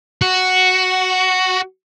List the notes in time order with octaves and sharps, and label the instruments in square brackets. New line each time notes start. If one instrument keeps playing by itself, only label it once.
[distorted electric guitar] F#4